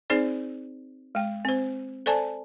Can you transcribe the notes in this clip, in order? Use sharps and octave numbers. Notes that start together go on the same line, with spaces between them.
C4 D#4 G#4 C5 D5
G#3 G5
C4 C5
A4 C5 D5 G#5 A5